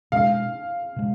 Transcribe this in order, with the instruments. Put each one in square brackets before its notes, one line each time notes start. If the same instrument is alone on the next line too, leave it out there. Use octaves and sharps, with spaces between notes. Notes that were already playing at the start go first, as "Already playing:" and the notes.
[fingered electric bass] B2 G#3 D4 [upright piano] F5
[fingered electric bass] B2 G#3